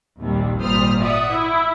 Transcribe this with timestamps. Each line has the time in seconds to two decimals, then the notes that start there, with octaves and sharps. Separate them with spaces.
0.19 A#1 D#2 C3 G3
0.59 G#1 A#2 G3 C5 D#6 F6
1.00 D5 E5 F#5 D#6
1.31 E4